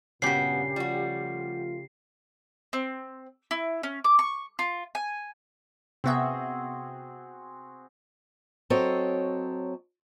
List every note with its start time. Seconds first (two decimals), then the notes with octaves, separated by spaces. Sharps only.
0.22 G2 A#2 C#3 B3 F#4 G4 C7
0.76 F3 G3 A3 F4 F#4
2.73 C4
3.51 E4
3.83 C#4
4.04 D6
4.19 C#6
4.59 F4
4.95 G#5
6.04 C3 B3 C4 F#4 G#4 E5
8.70 F#3 C4 A4 C#5 D#5